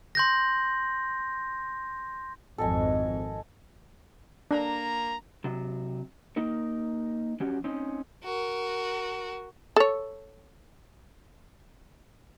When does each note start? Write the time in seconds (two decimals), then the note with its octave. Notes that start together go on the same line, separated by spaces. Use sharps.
0.15 C6 G6 A#6
2.58 G#1 F2 A4 D#5 G#5
4.51 A#3 D4 A#5
5.44 C3 F#3
6.36 A#3 D#4 A#4
7.40 F3 F#3 C#4 G4
7.64 C4 C#4 D#4
8.23 F#4 A#4
9.76 A4 C#5